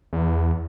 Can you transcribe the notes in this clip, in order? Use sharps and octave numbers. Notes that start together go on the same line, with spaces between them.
E2